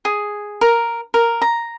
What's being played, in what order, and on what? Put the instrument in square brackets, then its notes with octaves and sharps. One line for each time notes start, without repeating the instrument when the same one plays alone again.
[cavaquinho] G#4
A#4
A#4
A#5